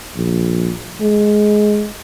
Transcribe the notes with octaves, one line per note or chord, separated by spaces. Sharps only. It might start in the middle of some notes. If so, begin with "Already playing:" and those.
A#1
G#3